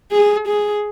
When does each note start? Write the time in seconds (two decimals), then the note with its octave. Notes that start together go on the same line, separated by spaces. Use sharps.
0.12 G#4
0.47 G#4